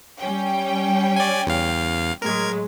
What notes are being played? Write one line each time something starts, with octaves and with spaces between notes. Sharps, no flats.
G3 C#4 G5
D5 G#5
E2 F5
A2 F#3 G#3 A#4 G#6